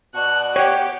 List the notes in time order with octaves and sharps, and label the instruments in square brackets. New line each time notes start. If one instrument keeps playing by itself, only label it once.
[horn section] B2 F#4 D5 [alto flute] A5 [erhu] F#6
[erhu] G4 [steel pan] C#5 F#5 [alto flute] G5